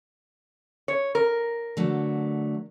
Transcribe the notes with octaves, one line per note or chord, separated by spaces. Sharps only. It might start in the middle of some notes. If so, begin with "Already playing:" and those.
C#5
A#4
D3 F#3 A3